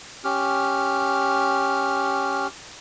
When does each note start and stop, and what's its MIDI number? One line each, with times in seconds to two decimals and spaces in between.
0.25 2.47 61
0.25 2.47 67
0.25 2.47 89